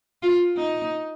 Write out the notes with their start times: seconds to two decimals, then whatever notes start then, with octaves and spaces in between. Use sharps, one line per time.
0.23 F4
0.57 D#4